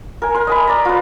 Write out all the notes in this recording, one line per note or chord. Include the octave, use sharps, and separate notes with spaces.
A#4 G#5
A#4 C6
D#5 G#5 B5
D5 A#5
F4 B4